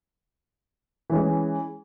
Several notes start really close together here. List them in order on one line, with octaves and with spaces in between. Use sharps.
E3 C#4 G#3